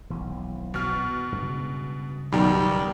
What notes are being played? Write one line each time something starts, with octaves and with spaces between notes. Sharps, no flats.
D#1 B1 E3
B2 F6
G2 C#3 G#3
F1 B1 D#3 G3 A#5